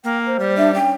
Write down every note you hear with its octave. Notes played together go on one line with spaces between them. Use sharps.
A#3 G5
C5
G3
D4 E5
C#4 G5